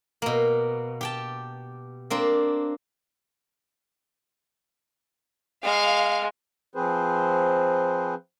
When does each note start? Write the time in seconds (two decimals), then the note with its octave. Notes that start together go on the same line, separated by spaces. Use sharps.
0.22 B2 A#3
1.01 G4 G5 A5
2.10 A#3 C4 D4
5.64 G#3 F5
6.75 F3 C4 G#4 B4 C5